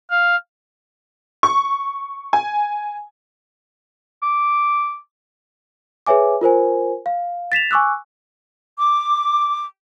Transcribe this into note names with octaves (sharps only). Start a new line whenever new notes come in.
F5
C#6
G#5
D6
G#4 B4 C#5 E5 G#5 D6
F4 A#4 C5 G#5
F5
A6 B6 E7 F7
G#5 C#6 D6 E6 F#6
D6